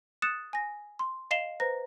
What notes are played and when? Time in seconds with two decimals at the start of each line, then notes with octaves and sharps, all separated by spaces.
0.22 D#6 F#6 A6 C#7 E7
0.53 G#5 A#6
0.99 C6
1.31 D#5 F5 C7 E7 F7 G7
1.60 B4 C5 A#5 A#6